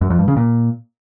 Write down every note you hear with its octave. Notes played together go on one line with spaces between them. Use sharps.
F#2
F2
G2
C#3
A#2